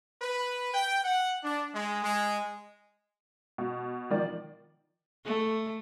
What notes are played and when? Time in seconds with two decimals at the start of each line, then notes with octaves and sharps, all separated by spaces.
0.22 B4
0.74 G5
1.04 F#5
1.43 D4
1.74 G#3
2.03 G#3
3.58 B2
4.10 D#3 F3 D5
5.25 A3